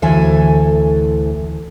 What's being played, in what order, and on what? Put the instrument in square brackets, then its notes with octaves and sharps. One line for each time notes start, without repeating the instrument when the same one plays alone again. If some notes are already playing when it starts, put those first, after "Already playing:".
[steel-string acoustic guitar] D2 E3 A4 G#5